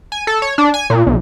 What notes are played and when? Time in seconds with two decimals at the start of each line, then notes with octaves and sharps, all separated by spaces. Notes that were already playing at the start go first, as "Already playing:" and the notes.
0.12 G#5
0.27 A4
0.42 C#5
0.58 D4
0.74 G#5
0.90 A#2
1.07 B1